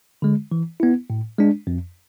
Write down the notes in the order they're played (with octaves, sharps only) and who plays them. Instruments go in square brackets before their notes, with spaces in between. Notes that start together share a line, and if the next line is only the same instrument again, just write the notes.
[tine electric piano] D3 G#3
E3
B3 E4
A2
G#3 D4
F2